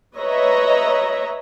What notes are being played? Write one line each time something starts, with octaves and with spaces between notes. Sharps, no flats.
B4 C#5 D#5 E5 A#5